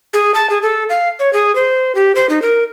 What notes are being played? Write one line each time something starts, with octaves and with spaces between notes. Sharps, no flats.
G#4
A5
G#4
A4
F5
C#5
G#4
C5
G4
C5
D#4
A#4